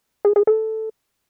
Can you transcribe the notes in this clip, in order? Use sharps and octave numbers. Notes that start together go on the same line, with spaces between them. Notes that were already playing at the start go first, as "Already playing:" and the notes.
G#4
G#4
A4